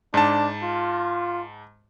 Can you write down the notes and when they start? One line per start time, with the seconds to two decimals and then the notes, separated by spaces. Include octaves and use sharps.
0.14 G#2 D4 A5
0.63 F4